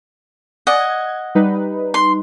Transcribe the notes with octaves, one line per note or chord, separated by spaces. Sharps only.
D5 D#5 F#5 G#5
G#6
G3 D#4 B4
C6